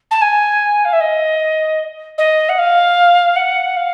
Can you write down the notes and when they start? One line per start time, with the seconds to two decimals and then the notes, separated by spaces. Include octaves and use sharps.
0.11 A5
0.21 G#5
0.85 F5
0.93 E5
1.00 D#5
2.18 D#5
2.49 F#5
2.58 F5
3.36 F#5
3.77 F5